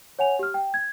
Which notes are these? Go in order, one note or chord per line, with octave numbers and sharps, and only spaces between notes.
C#5 F#5 G#5 F7
G4 F6
G5
G#6